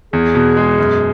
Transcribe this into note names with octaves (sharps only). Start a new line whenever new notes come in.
E2 G#4
B2
G#3
F#2